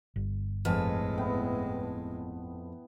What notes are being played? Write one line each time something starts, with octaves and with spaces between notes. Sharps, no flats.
G1
F2 A2 G#3 B4 F5 G#5 A5
B3 E4 G5